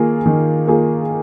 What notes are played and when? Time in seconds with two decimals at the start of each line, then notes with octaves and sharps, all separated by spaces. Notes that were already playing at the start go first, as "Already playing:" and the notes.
Already playing: D#3 A#3 F4 G#4
0.26 D#3
0.67 A#3 F4 G#4